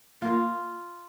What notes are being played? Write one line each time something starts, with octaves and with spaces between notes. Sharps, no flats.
A#3 F4